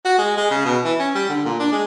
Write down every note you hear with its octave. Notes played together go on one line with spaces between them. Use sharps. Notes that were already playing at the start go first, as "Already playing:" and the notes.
F#4
G#3
G#3
C#3
B2
E3
C#4
G3
D3
A#2
D4
G#3